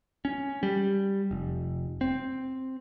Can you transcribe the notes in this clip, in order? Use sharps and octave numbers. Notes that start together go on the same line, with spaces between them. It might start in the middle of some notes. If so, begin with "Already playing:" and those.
C#4
G3
F1
C4